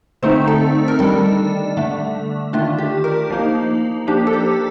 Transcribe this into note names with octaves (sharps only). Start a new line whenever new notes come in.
D3 A3 C4 D#4 C5
A4
A#4
D#3 G3 D4 A4
D3 A3 D4
D#3 A3 D4 F4
G4
A#4
F3 A#3 D#4
F3 A#3 D4 G4
A4
G4